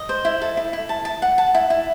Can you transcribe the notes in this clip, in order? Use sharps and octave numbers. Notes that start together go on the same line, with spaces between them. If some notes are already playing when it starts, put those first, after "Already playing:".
Already playing: D#5
C5
E4
A4
E4
E4
A5
A5
F#5
A5
E4
E4